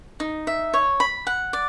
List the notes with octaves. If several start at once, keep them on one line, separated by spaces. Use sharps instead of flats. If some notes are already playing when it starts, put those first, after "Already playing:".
D#4
E5
C#5
B5
F#5
D5